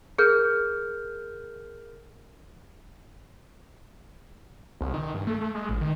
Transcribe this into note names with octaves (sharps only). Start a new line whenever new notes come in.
G#4 A#4 F6 G6
C2
D#3
G2
A3
A3
G#3
A1
D#3